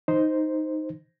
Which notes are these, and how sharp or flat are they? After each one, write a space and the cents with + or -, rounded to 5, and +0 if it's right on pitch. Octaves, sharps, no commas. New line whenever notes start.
D#4 +5 C5 +0